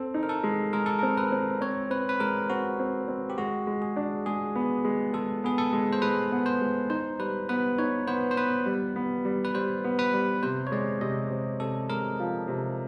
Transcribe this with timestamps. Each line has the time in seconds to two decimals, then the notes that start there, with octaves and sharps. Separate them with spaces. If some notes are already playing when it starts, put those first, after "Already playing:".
Already playing: C4 A4
0.14 D#4
0.23 A#4
0.29 A4
0.43 G#3
0.73 G#3 A#4
0.86 A4
0.99 A#4
1.03 C4
1.18 B4
1.32 C4
1.61 C4 C#5
1.90 C4 B4
2.09 B4
2.20 G#3 A#4
2.49 C4 F#4
2.79 C4
3.08 C4
3.30 G4
3.38 G#3 F#4
3.67 G#3
3.82 G#4
3.96 D4
4.26 G#3 G#4
4.55 B3
4.85 G#3
5.14 G#3 A4
5.44 B3 G#4
5.58 A4
5.73 G#3
5.93 C5
6.02 G#3 B4
6.32 B3
6.46 C5
6.61 G#3
6.90 D#4 C5
7.19 G3 B4
7.49 B3 B4
7.78 D#4 C#5
8.07 B3 C5
8.31 C5
8.37 B3 B4
8.66 G3
8.96 B3
9.25 G3
9.45 B4
9.54 G3 C5
9.84 B3
9.99 B4
10.13 G3
10.43 C3 C5
10.67 C#5
10.72 G#3 D5
11.01 C3 D#5
11.31 C3
11.60 C3 A4
11.89 G#3 A#4
12.20 F3
12.48 C3